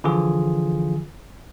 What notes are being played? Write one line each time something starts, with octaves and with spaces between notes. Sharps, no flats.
D3 E3 F3 F4 G#4